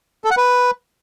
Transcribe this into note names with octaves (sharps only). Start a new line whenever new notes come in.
A4
F#5
B4